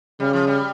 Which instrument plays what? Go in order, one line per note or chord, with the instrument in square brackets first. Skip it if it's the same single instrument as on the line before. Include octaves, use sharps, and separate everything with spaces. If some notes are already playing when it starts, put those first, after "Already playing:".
[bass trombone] C#3 [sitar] G3
[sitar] F3
G3